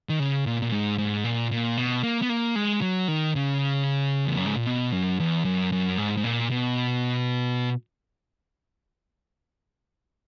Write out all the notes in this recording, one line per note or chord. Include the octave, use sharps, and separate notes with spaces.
D#3
C#3
A#2
A#2
G#2
G#2
A#2
A#2
B2
A#3
B3
A#3
G#3
F#3
D#3
C#3
E2
F#2
G#2
A#2
B2
F#2
E2
F#2
F#2
G#2
G#2
A#2
B2